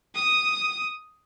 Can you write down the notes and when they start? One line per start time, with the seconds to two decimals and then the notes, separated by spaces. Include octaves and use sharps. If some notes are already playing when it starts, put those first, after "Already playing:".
0.15 D#6